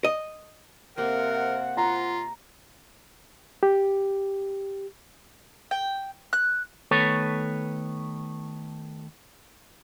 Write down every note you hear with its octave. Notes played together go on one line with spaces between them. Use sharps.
D#5
C3 A#3 A#4 C5 F#5
F4 A#5
G4
G5
F#6
D#3 A3 B3 A4 B4 C#5